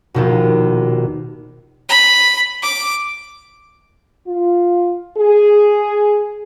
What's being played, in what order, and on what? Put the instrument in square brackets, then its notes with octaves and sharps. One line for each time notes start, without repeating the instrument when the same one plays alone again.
[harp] A#1 D#2 B2
[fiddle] B5
D6
[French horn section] F4
G#4